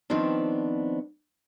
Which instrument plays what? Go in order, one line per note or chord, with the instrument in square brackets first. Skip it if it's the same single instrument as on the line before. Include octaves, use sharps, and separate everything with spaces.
[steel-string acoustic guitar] D#3 F3 B3 C4 D4